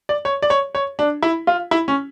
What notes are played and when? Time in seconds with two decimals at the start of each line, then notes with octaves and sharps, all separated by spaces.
0.09 D5
0.25 C#5
0.43 D5
0.50 C#5
0.75 C#5
0.99 D4
1.22 E4
1.47 F4
1.71 E4
1.88 C#4